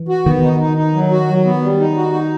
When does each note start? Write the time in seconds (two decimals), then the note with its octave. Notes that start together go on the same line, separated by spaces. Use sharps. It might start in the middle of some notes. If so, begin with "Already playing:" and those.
Already playing: E3
0.08 F#4
0.26 D#3 B3
0.42 D#4
0.60 D#4
0.77 D#4
0.94 F#3
1.11 F#4
1.28 F#3
1.45 B3
1.62 G3
1.79 D#4
1.96 F#4
2.13 D#4